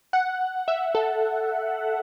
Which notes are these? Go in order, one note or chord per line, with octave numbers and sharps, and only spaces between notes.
F#5
E5
A4